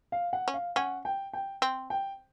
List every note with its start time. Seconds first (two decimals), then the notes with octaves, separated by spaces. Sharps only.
0.12 F5
0.33 F#5
0.48 C#4
0.54 F5
0.76 C#4 F#5
1.05 G5
1.33 G5
1.62 C4
1.90 G5